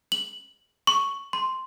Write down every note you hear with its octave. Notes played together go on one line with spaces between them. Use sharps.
F#7
C#6
C6